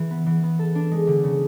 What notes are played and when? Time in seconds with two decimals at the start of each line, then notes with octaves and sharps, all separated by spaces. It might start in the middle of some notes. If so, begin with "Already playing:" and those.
Already playing: E3 E4
0.11 B3
0.26 E3
0.43 B3
0.59 A4
0.75 D4
0.91 G#3
1.07 D3
1.24 C#3